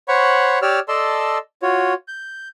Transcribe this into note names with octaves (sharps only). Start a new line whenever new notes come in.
C5 C#5 F#5 B5 C#6
G4 C#5 D5 E6 F6
A4 D5 D#5 A5 C6 E6
F4 F#4 C#5
G6